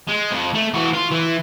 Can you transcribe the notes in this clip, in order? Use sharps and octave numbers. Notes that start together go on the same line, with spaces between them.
G#3
F2
A3
E3 F#4
F4
E3